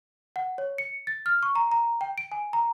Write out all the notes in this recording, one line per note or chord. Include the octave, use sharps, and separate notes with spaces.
F#5
C#5
C#7
A6
F6
C#6
A#5
A#5
G5
D7
G#5
A#5